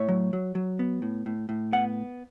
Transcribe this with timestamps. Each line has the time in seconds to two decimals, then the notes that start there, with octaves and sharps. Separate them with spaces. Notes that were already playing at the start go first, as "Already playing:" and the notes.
Already playing: A2 C#5 E5
0.08 F#3
0.33 F#3
0.55 F#3
0.79 B3
1.02 A2
1.26 A2
1.49 A2
1.72 B3 F#5